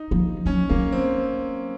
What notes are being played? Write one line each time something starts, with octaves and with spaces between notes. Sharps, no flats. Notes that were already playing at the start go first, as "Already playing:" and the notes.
Already playing: D#4
F3
F#3 C#4
F#3 A#3
C4